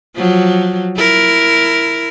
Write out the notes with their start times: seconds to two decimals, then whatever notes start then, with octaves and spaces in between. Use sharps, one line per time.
0.16 F3 F#3
0.97 E4 A#4